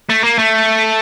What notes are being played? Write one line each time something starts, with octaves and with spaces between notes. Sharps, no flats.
A3
A#3
A3